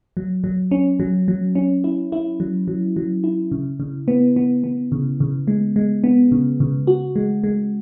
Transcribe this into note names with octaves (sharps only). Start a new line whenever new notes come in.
F#3
F#3
C#4
F#3
F#3
C#4
E4
E4
F#3
F#3
F#3
E4
C#3
C#3
B3
B3
B3
C#3
C#3
G#3
G#3
B3
C#3
C#3
F#4
G#3
G#3